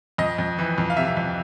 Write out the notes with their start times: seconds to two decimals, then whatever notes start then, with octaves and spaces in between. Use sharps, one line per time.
0.18 F2 D#5
0.38 F2
0.59 E3
0.78 F2
0.90 F5
0.97 C3 E5
1.17 F2